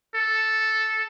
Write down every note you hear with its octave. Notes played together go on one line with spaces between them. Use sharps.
A4